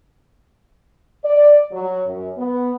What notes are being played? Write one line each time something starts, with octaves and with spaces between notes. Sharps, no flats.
D5
F#3
F#2
B3